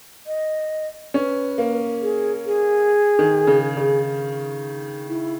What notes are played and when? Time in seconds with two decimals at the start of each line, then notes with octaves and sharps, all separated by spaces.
0.26 D#5
1.14 C#4 B4
1.58 A#3
2.02 G#4
2.46 G#4
3.19 D#3
3.47 C#3
3.77 C#3
5.08 E4